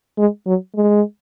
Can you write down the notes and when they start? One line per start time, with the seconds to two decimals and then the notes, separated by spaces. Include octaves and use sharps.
0.18 G#3
0.46 F#3
0.75 G#3